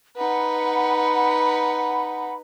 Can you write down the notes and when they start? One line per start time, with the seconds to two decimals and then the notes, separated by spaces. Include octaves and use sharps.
0.17 D#4 B4 F#5 B5